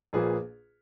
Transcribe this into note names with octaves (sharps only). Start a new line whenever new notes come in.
A#1 A#2 A#3 G#4 B4